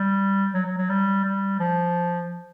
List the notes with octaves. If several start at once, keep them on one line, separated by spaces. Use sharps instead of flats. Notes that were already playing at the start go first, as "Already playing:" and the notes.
Already playing: G3
F#3
F#3
F#3
G3
G3
F3